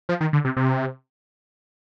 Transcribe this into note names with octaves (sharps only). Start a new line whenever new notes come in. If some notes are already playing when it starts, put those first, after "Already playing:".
F3
D#3
D3
C3
C3